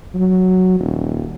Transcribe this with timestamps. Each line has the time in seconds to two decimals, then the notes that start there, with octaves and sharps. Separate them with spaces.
0.15 F#3
0.80 D#1